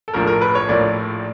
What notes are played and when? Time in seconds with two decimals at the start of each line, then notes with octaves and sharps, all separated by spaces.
0.08 A4
0.13 A#1 A2 F3 A#3 A#4
0.27 A#4
0.41 B4
0.55 C#5
0.69 A#1 A2 F3 A#3 D5